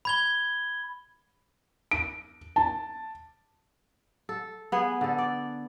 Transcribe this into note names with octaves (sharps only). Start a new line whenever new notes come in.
B5 G#6 G7
D7
A5
A4
B3 G#4
D3 A4
D5